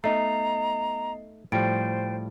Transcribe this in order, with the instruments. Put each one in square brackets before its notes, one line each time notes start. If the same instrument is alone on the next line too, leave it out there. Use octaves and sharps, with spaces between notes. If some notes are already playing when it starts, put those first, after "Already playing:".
[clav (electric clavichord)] A3 D#4 [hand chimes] B3 D#5 C7 [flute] A#5
[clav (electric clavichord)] A2 F3 G3 [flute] C5 [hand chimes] G5 A6 D7